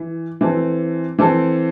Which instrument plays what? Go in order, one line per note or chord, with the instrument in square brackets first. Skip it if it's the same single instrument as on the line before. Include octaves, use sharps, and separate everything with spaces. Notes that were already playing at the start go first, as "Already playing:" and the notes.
Already playing: [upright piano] E3
E3 C4 A4
E3 C4 A4